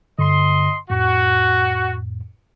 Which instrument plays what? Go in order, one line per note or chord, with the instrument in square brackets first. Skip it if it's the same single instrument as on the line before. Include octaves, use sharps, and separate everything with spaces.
[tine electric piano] G2 D3 [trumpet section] D#5 C6
[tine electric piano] F2 A2 [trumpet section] F#4